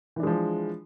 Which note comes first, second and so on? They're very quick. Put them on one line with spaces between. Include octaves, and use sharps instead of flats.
E3 D4 G#3 F3